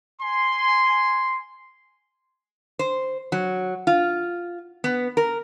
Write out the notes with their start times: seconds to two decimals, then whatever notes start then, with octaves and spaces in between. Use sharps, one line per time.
0.21 G#5 C6
2.79 C5
3.32 F#3
3.87 F4
4.84 B3
5.17 A#4